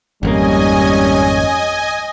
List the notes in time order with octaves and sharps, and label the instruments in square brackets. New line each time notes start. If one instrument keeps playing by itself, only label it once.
[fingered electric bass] G#1 F2 A#3 [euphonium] G3 [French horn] C#4 [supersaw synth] D#5 G#5